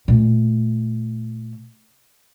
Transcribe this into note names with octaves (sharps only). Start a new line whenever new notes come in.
A#2 A3